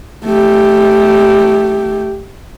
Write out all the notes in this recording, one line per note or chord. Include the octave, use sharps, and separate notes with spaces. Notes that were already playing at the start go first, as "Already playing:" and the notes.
A3 G4